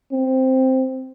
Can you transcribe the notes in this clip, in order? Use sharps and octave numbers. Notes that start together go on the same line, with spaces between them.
C4